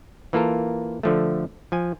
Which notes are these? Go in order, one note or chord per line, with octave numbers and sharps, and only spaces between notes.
E3 A#3 F4 A4 A#4
D3 F3 A3
F3 G#5